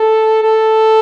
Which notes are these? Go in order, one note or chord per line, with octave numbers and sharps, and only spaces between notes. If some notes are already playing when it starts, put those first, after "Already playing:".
Already playing: A4
A4